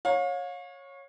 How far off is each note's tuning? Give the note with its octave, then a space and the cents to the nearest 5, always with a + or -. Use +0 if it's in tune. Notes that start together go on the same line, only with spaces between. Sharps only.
C#5 -10 F5 +35